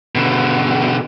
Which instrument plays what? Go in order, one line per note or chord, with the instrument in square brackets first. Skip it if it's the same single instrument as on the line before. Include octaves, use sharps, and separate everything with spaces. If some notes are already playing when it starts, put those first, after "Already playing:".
[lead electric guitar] B2 D3